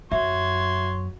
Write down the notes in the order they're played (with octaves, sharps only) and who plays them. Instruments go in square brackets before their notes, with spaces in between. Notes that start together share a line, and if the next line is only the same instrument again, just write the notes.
[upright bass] F#2 [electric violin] F#4 G#6 [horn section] C#5 C6 [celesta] E5